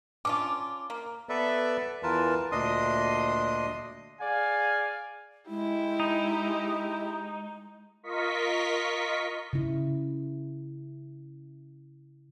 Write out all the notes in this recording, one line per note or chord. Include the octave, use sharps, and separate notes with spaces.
C#4 D4 F4 D6
A#3
B3 A4 B4 D5 E5
E2 E3 F4 A#4 B4 A5
D2 A#2 D4 D#5 C6 D#6
G#4 D5 F5 G#5
G#3 E4 G4
D#4
F4 A#4 D#5 C#6 B6
C#3 E4